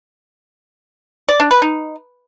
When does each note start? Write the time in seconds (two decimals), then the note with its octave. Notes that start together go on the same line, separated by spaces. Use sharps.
1.29 D5
1.40 D4
1.51 B4
1.62 D#4